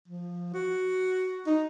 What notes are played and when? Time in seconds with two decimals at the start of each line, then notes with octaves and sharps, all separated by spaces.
0.08 F3
0.54 F#4
1.47 D#4